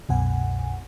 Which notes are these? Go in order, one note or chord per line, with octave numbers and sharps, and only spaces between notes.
C2 F#2 B2 F#5 G#5